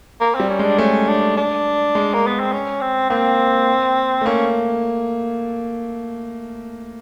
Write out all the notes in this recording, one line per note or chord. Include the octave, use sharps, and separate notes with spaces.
A#3
G3 C4
C#4
G#3
D4
A3 C#4
D4
D4
G#3
A#3
B3
C4
C#4
C4
A#3 C4
A3
A#3 C#4